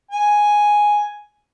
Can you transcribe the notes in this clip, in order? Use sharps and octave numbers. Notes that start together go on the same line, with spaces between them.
G#5